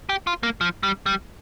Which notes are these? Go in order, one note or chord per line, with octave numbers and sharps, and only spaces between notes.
G4
F4
A#3
F3
G3
G3